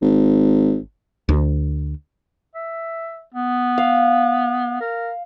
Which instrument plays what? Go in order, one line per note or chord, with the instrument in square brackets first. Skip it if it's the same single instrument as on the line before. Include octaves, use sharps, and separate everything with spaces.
[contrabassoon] G#1
[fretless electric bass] D2
[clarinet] E5
B3
[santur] F5
[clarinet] A#4